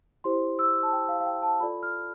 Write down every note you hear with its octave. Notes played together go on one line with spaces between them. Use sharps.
E4 G4 C5 C6
E6
A5
G5
F5
F5
G5
A5
F4 A4 D5 B5
F6